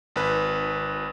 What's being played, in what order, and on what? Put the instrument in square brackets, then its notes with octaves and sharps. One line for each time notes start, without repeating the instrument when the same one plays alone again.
[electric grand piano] G#1 B4